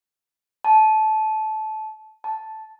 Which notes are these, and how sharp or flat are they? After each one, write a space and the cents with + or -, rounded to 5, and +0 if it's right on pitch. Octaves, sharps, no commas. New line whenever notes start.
A5 -20
A5 -5